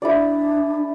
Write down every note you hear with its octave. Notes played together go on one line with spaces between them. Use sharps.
D4 E4 G#4 D5